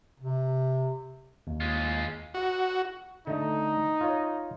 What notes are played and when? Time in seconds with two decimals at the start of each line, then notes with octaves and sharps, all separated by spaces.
0.20 C3
1.47 D#2
1.61 G#3 F4
2.34 F#4
3.27 D3 A3 D#4
4.01 F4 C#5